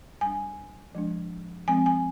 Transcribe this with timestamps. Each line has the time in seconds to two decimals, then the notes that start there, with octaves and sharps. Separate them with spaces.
0.21 G3 D4 G#5
0.95 F3 G#3 D4
1.68 F3 G#3 C4 G#5
1.86 G#5